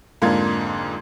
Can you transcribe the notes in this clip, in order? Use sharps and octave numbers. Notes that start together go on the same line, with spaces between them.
F2 G#2 D3 A#3 F5 G#6